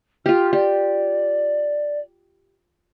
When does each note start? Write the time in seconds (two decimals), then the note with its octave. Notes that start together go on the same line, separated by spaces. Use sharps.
0.26 F4 G4 F6
0.53 G4 D5